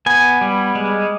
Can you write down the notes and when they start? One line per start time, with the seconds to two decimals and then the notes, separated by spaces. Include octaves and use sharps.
0.06 B3 G#5
0.41 G3
0.75 G#3